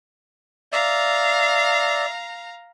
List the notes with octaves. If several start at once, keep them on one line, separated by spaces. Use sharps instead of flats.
D5 E5 F5 A#5